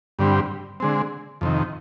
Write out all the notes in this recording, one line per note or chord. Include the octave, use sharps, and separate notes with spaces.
G2 D3 G3 C4
D3 G#3 C4
F2 C3 D#3